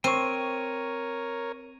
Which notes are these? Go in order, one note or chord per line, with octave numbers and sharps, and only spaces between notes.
C4 A#4 C#5 G5 C#6 D#7